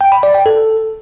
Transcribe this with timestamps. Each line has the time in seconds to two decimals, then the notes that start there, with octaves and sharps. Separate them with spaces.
0.01 G5
0.12 B5
0.23 D5
0.34 G5
0.46 A4